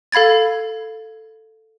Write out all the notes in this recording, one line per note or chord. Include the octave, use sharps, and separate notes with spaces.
A4 F5 B5 G#6 A6